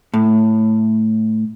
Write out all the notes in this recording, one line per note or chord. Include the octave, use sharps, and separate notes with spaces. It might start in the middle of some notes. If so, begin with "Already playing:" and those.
A2